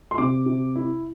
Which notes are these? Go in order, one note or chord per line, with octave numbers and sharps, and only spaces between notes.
C6
C3 D6
C3
E4